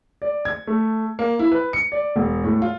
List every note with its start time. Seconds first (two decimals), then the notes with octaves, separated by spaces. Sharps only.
0.22 D5
0.45 G#6
0.67 A3
1.19 A#3
1.39 E4
1.52 B4
1.73 C#7
1.92 D5
2.16 E1
2.43 A2
2.62 F4